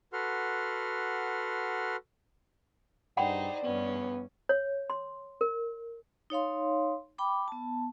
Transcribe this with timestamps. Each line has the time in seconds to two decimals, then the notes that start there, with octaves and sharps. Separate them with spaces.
0.13 F#4 A4 B4 F#5 C6 F6
3.17 G2 D#4 G#4 C5 D5 F#5 G5 B5
3.63 G2 B3 C#4
4.49 C#5
4.90 C6
5.41 A#4
6.30 D#4 C#5 F5 C6
7.18 G5 B5 D6
7.48 B3 A5